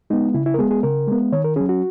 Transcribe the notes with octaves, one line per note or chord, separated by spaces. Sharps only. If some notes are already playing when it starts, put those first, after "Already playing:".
G#3 B3 D#4
C#3 E4
E4
A#4
G#3 B3 G#4
G#4
C#3 A#4
G#3 B3
D#3 C#5
A#4
F#3 C#4 G#4
F#4